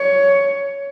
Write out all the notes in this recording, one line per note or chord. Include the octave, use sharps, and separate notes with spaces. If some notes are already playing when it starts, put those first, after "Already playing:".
Already playing: C#5